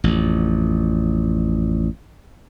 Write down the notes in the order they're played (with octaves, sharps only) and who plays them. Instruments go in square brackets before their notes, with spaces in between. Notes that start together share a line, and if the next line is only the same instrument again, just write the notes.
[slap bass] A1 F2